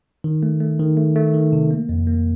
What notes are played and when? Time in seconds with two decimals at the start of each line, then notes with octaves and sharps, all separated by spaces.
0.24 D#3
0.43 A3
0.61 A3
0.79 D#3
0.97 A3
1.16 A3
1.34 D#3
1.53 C3
1.71 A#3
1.89 F2
2.07 A#3